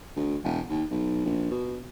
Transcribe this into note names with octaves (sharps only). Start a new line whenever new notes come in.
D2
E1
D#2
B1
A#1
B2